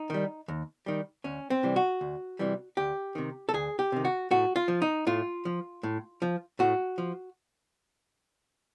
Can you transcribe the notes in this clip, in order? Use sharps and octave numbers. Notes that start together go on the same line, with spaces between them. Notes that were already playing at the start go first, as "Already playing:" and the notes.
Already playing: D#4
D#3 G3
D#2
D#3 G3
D2 C#4
C4
C3 E3 G3
F#4
D2
C3 E3 G3
D2 G4
C3 D#3
A4
D2 G#4
G4
C3 D#3
F#4
A2 F#4
F4
F3
D#4
A2 F4
F3
A2
F3
A2 F#4
F3